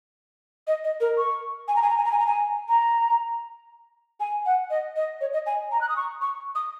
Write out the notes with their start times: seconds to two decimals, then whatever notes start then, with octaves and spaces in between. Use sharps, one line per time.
0.67 D#5
0.84 D#5
1.00 A#4
1.18 C#6
1.68 G#5
1.76 A#5
1.82 G#5
1.90 A#5
1.97 G#5
2.05 A#5
2.12 G#5
2.19 A#5
2.27 G#5
2.68 A#5
4.20 G#5
4.46 F#5
4.70 D#5
4.96 D#5
5.21 C#5
5.33 D#5
5.46 G#5
5.72 A#5
5.81 F#6
5.89 D#6
5.97 C#6
6.22 C#6
6.55 D#6